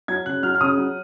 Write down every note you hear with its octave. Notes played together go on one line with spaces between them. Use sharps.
F#3 G#6
C#3 F#6
F#3 F6
F6
C#3 D#6
F#3